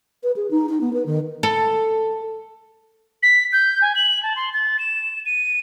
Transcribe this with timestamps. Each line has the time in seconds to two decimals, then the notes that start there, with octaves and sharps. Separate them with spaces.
0.23 B4
0.36 G#4
0.51 D#4
0.69 D#4
0.81 B3
0.93 B4
1.06 D#3
1.43 A4
3.23 B6
3.53 G6
3.82 G#5
3.96 F#7
4.23 A5
4.36 C6
4.54 A6
4.79 E7
5.26 D#7